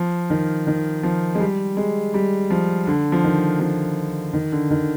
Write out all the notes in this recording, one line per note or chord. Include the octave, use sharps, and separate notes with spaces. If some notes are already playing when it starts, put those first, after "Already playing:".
Already playing: F3
D#3
D#3
F3
G#3
G3
G#3
G3
F3
D3
F3
D#3
F3
D#3
D3
D#3